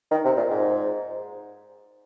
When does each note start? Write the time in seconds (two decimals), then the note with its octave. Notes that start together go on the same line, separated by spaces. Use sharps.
0.11 D#3
0.25 C3
0.37 A#2
0.50 G#2